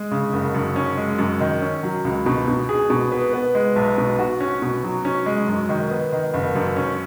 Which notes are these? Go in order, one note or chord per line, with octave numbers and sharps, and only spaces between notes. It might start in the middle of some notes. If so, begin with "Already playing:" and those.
Already playing: G#3
C#3
F#1
F#2
C#4
G#3
F#2
D#3
C#4
F#3
C#2
B2
B2
G#4
B2
B3
B3
G#3
B1
B2
F#4
C#4
B2
F#3
C#4
G#3
F#2
D#3
B3
D#3
F#1
F#2
C#4